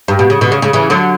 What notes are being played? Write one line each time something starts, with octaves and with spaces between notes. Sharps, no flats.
G2
B2
C#3
B2 D3
C#3
C#3
C#3 E3
D3 F#3